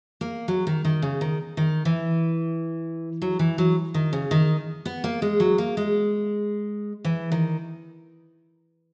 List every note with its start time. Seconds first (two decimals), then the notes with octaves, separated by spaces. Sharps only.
0.21 A#3
0.48 F#3
0.67 D#3
0.85 D#3
1.02 C#3
1.21 D#3
1.57 D#3
1.85 E3
3.22 F#3
3.39 E3
3.58 F#3
3.94 D#3
4.13 C#3
4.31 D#3
4.85 B3
5.04 A#3
5.22 G#3
5.40 F#3
5.58 A#3
5.77 G#3
7.05 E3
7.32 D#3